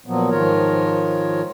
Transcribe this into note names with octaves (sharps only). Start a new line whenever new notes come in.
A#2 F3 F#3 B3
G#2 D#3 F3 F4 A#4 C#5